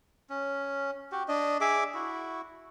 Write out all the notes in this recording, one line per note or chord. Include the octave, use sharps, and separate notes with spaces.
C#4
F#4 G4
D4 D#5
G#4 E5 D6
E4 F#4